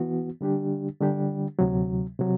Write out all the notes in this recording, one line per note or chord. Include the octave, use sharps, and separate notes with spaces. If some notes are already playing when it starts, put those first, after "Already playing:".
Already playing: E3 B3 F#4
D3 G3 D4 G4
D3 G3 D4 G4
D2 C3 F#3
C3 F#3